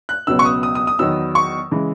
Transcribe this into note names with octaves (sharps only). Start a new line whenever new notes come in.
F#6
C#2 B2 F#3 B3 E6
C#6
D#6
D#6
D#6
D#6
E2 D#3 F#3 B3 E6
C#6
C#3 E3 G#3